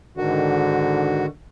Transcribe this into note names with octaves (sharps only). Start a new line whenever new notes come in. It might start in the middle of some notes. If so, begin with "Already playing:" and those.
G#2 D3 D#3 F#4